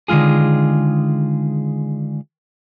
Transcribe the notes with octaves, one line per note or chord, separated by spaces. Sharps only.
D3 D#3 G#3 F4 G#4